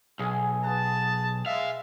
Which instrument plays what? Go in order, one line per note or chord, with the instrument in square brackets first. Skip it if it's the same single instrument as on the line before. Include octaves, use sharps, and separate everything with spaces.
[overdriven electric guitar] B1 [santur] G#4 A4 G#5
[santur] B3 F#5 [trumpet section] G#4 A5
[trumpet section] G#3 E5 [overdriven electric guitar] F5